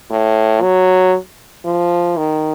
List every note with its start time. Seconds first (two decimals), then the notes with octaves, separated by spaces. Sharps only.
0.10 A2
0.62 F#3
1.65 F3
2.17 D#3